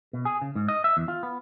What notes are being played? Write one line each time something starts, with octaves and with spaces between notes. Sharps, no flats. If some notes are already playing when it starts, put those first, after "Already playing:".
B2
G#4
C#3
G#2
D#5
E5
E2
F4
B3